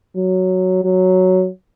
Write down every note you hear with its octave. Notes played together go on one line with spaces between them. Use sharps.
F#3
F#3